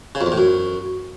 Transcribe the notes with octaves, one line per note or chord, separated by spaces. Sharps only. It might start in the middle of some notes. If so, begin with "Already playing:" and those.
C#3
F2
E2
A2
F#2